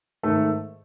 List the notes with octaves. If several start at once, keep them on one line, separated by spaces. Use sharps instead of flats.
G#2 D#3 A3 A4